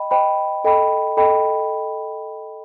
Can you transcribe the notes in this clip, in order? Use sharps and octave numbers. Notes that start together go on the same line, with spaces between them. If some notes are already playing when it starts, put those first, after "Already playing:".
Already playing: D#5 G5 B5
C5 D#5 G5 B5
A4 D#5 G5 B5
A4 D#5 G5 B5